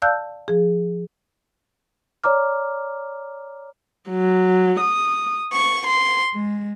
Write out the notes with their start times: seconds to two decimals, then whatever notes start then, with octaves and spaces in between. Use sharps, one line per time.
0.02 D5 F5 A5 E6 F#6 G6
0.48 F3 G#4
2.24 C#5 D5 A#5 D6 F6
4.11 F#3
4.80 D#6
5.54 C#6
5.88 C6
6.34 G#3